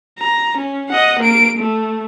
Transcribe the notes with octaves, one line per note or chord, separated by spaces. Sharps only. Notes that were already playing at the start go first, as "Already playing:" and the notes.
A#5
C#4
D#5 F#5
A#3 D7
A3